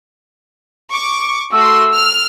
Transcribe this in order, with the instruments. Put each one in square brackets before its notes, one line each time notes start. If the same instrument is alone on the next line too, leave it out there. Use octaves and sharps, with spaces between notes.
[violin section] C#6 D6
[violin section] A3 F#4 C6 [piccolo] E6
[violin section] F6